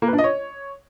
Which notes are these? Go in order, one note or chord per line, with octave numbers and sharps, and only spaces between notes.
A#3
B4
D4
D#5
C#5